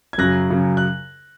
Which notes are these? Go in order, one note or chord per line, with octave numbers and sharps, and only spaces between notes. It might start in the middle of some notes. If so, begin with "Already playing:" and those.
G#6
F#2 C#3 F#3 F#6 A#6
F#2 C#3 F#3
F#6